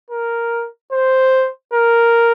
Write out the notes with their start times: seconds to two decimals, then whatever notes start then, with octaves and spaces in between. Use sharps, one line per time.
0.10 A#4
0.92 C5
1.73 A#4